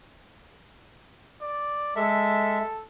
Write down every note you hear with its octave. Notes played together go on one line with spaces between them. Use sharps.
D5
G#3 A4 E5